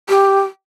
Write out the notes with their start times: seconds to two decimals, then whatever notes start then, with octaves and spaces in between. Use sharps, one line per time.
0.09 G4